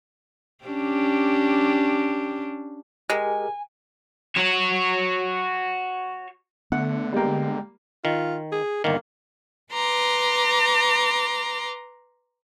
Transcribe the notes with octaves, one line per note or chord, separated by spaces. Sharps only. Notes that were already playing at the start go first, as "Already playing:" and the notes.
C#4 D4 G4
G#3 G4 G#4 A#4 G#5
F#4 C#5
D3 A3 B3 F#5
G3 G#3 A#3 G5
D#3 F4
G#4
G1 D#3 A#3
B4 A#5 C6 D6